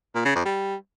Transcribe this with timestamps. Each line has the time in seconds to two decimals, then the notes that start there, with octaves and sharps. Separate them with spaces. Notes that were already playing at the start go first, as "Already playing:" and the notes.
0.15 A#2
0.25 C#3
0.35 F2
0.45 G3